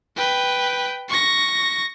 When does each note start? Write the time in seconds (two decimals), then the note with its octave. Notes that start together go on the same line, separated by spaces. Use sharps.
0.16 B4 G5
1.09 C#6 A#6